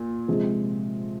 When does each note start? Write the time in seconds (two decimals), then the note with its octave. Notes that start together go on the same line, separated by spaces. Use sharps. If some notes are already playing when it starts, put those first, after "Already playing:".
Already playing: A#2
0.28 C3 F3 G#3